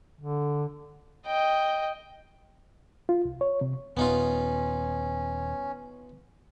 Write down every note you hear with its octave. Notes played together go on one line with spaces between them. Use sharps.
D3
D#5 G5
F4
C2
C#5
C3
D#1 B3 C#4 D#4 F4